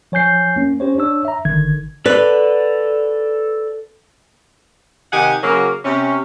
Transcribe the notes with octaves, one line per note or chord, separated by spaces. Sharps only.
F3 C#5 G#5 G6 C7
A#3 C#4
C#4 G4 C5 C#5
D4 C#5 E6
E5 A#5
G#1 D3 D#3 G#6
A4 B4 D5
C3 D#3 G4 D#5 F#5 G#5
C#3 F#3 A#3
C3 C#4